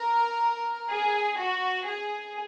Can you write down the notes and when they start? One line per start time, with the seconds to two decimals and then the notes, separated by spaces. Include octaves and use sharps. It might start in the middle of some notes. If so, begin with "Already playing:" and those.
Already playing: A#4
0.91 G#4
1.39 F#4
1.86 G#4